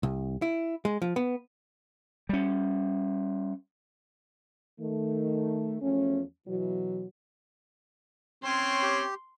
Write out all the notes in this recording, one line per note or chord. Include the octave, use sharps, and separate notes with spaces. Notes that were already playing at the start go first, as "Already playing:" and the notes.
C2
E4
G#3
F3
B3
G3 C#4
D#3 A3
E2 F3 A3 C#4
B2 E3 F#3
C4 C#4 C#5 C6
G4